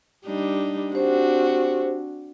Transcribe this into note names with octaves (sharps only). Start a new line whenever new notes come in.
G3 D4 D#4
C4 D4 F#4 G4 C5